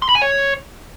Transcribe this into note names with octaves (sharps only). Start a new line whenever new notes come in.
C6
B5
G#5
C#5